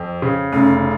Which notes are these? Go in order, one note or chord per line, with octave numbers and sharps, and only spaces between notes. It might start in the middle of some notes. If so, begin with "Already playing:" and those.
Already playing: F2
C#3
F1 C#4